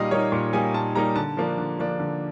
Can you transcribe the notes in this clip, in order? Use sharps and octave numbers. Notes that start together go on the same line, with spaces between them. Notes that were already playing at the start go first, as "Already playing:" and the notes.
Already playing: A#2 G3 A#3 D#4 D#5 F5
G3 A#3 D#4 C#5
A#2
G3 A#3 D#4 G#5
A#2 A5
G3 A#3 D#4 A#5
D3 A5
F3 A#3 D4
D3
F3 A#3 D4
D3